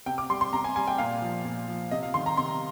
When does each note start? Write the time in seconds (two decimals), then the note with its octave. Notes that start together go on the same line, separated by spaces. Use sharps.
0.06 C3 G5
0.18 D6
0.30 G3 C6
0.41 C6
0.52 C3 A#5
0.64 G#5
0.76 G3 G#5
0.87 G5
0.98 A#2 F5
1.22 F3
1.45 A#2
1.68 F3
1.91 C3 D#5
2.03 F5
2.14 D#3 G3 C6
2.26 A#5
2.37 C3 C6